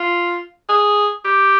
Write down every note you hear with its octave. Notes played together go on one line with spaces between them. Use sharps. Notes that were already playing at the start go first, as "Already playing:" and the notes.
Already playing: F4
G#4
G4